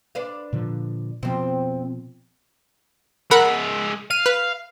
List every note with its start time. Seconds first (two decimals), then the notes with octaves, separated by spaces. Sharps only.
0.15 D4 B4 F5
0.53 A#2 D3 F3
1.23 F2 B2 F3 C4
3.31 G#3 A#4 E5 F#5 B5
4.11 F5 D#7
4.26 B4